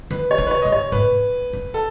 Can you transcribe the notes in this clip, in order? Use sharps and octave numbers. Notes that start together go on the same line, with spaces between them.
D#3 B4
C#5
D#3
B4
C#5
G#2 D#5
C#5
G#2 B4
F#2
A4